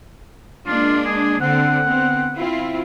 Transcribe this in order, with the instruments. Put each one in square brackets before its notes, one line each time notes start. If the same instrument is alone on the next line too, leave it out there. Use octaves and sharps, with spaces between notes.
[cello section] G#3 A#3 D4 [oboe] F4
[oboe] G#4
[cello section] D3 C4 [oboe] F#5
[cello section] B3 C4
C4 E4 F4